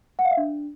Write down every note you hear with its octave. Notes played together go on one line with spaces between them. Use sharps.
F#5
F5
E5
D4